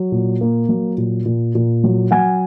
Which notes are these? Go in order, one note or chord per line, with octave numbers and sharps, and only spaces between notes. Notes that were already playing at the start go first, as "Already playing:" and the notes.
Already playing: F#3
A#2
A#3
F#3
A#2
A#2
A#2
F#3
F#3 F#5 G#5